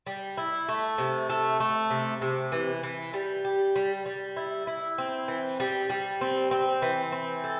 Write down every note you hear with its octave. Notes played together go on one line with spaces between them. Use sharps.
G3
E4
A3
C3
A3
A3
C3
C3
E3
E3
G3
G4
G3
G3
E4
E4
C4
E3
G3
G3
C4
C4
E3
C4
A4